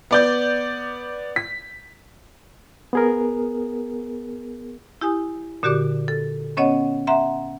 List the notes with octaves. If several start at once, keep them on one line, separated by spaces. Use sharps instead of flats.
B3 D5 G6
B6
B3 G#4 A#4
E4 G4 G#5 D#6
A#2 D3 F#4 G4 D5 D6
A4
B3 C#4 C#5 D#5 F#5
E5 F#5 A#5 C6